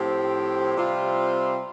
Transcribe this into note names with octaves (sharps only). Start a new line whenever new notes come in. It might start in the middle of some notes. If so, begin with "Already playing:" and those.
Already playing: A2 F3 C4 G4
C3 G3 C4 F4